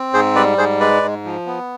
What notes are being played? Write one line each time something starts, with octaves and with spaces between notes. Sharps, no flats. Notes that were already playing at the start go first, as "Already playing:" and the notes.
Already playing: C4
G#2 G#4 C5
G3 B4 D5
G#2 G#4 C5
G#3 B4 D5
G#2
F3
B3